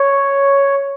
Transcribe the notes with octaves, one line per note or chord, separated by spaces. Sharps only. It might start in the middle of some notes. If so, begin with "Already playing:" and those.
Already playing: C#5